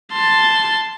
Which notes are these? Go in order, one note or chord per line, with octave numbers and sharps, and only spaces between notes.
A5 C6